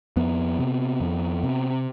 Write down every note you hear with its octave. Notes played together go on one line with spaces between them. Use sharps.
F2 B3
C3
F2
C3